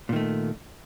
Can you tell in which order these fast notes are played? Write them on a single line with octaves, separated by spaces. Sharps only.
A#2 D#3 A3